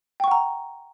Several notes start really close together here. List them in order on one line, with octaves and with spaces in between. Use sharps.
G5 C#6 F#5 A#5